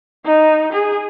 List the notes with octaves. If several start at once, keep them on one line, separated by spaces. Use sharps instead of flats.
D#4
G#4